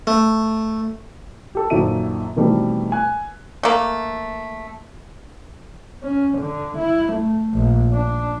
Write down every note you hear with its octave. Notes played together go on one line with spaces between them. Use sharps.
A3
G4 A4
A#1 F#2 D#3 A4 E5 D#7
B2 D#3 E3 G3 A3 C4
G#5 F#6
A3 A#3
C#4
D3
E4
A3
A#1
D4